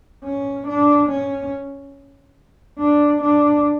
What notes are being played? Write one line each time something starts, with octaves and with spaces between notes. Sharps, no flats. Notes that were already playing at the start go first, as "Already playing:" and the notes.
C#4
D4
C#4
D4
D4